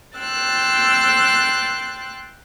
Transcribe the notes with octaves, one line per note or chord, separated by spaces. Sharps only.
G5 C6 E6 F#6 A6